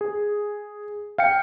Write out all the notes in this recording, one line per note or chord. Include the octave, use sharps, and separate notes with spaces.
G#4
F5 G5 C#7